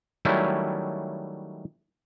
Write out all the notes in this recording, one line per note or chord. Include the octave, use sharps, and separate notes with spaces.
D#3 F#3 G3 A3 C#4 E4